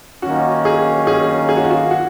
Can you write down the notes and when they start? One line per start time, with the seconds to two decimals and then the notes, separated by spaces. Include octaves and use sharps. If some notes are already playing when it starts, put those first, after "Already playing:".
0.22 D#3 F#3 A#3 C#4 F#4
0.65 G#4
1.07 G#4
1.49 G#4
1.57 F#4
1.63 F4
1.70 F#4
1.91 F#4